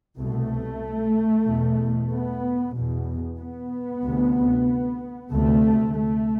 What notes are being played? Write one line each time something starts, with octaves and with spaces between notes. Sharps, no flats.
C2 B2 A3
E2 B2
B3
E2 B2
B3
D2 C3
D2 C3 A3
A3